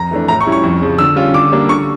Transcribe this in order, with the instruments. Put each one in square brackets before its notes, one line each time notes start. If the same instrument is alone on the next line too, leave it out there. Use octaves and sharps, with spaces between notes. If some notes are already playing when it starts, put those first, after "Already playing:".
Already playing: [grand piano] F2 A#5
E3 A3 D4
A2 A#5
C#6
G3 C#4 E4
C#6
F2
C#3 F3
D3 E6
G3 C#4 F4
D3 D6
G3 A#3 D4
D3 C#6